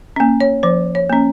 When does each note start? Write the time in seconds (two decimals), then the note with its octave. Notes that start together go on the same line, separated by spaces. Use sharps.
0.16 A#3 C#4
0.40 C#5
0.63 F3 C5
0.95 C#5
1.10 A#3 C#4